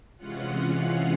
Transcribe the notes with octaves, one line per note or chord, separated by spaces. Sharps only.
C3 E3 G#3 C#4 F4 F#5
F5